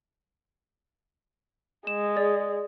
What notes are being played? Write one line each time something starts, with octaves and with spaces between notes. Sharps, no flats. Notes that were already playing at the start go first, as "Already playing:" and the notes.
G#3 E7
G#4 D5